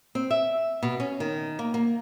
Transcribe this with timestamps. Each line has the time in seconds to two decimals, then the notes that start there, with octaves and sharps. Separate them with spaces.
0.15 C4
0.31 E5
0.83 B2
1.00 C#4
1.20 D#3
1.59 A#3
1.74 A#3